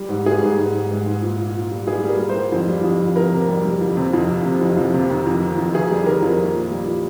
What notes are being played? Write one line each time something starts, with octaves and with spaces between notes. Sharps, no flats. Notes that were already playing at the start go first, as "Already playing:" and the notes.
Already playing: G3
G#2
G3 G#4
G#2
G#2
G#2
G#2
G#2
A#2
A#2
A#2
G3
G3 G#4
G3
A#4
G3
C5
G3
F2
G3
F2
F2
F2 A#4
C3
G3
G3
F2
C3
F2
F2
C3
F2
F2
C3
D#3
F2
D#3
F2
D#3 G#4
G3
D#3 A#4
F2
A#2
A#2
G3
A#2